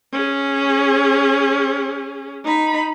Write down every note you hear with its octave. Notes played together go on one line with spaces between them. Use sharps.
C#4 G#4
D#4 B5